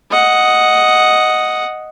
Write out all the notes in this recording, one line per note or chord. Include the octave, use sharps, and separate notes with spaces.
D#5 F#5